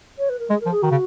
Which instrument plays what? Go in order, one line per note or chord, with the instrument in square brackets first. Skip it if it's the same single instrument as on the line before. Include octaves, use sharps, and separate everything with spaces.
[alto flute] C#5
B4
A#4
[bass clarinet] G#3 [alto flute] G#4
[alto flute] A#4
[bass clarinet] F3
[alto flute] G#4
[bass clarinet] D#3 [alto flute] F#4
[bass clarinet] C#3